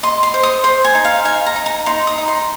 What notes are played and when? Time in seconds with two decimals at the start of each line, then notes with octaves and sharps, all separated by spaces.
0.03 D#5 C6
0.23 C6
0.34 C5
0.43 D#6
0.64 C5 C6
0.84 G#5
0.95 D#4
1.05 F5
1.25 D#4 G#5
1.46 A#5
1.56 D#4
1.66 A#5
1.86 D#4 C6
2.07 D#6
2.18 D#4
2.28 C6